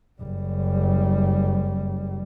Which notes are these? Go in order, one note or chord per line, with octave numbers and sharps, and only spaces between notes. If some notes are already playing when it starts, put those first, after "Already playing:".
F#1 G3